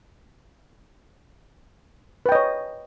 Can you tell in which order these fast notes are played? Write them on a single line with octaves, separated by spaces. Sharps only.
B4 G5 D#5 C#5